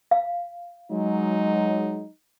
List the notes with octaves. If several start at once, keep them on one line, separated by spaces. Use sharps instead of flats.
F5
F#3 G#3 D#4